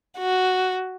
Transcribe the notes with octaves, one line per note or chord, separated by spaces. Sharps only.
F#4